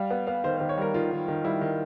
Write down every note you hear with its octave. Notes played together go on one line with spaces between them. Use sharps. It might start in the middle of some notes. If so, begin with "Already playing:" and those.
Already playing: G3 F5
B3 F#5
B3 F5
D#3 C5
D#3 C5
C#5
G3 A#4
D#3 F4
D#3
D#3
G3 E4
D#3